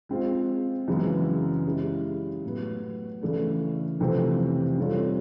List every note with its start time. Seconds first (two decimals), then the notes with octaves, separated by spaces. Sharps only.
0.09 G#3 C4 F4
0.88 F#2 C#3 E3 G#3 B3
1.65 G#3 C#4 E4 G4
2.44 A2 F#3 B3
3.22 C#3 E3 A3 D4
4.00 F2 C3 E3 A3 C4
4.78 G3 C4 F4 A4 C#5